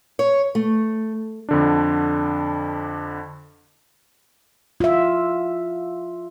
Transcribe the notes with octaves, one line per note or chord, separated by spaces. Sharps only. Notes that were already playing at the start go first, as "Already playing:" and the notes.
C#5
A3
F2 D3 D4
F4 E5